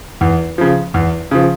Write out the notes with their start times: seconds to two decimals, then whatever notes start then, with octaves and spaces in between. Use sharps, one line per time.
0.21 E2
0.58 C#3 F3
0.94 E2
1.31 C#3 F3